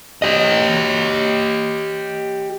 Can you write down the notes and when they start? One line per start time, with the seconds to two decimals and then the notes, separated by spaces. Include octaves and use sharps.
0.22 G4 D#5